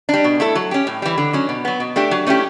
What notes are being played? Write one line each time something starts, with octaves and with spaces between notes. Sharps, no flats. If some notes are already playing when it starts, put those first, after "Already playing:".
G3 D4
B2
A3 E4 A4
F#3
C#4 G4
A2
E3 G3
D3
F#3 C#4
B2
F#3 B3
B2
A3 D4 G4
F#3
A3 C#4 E4 G4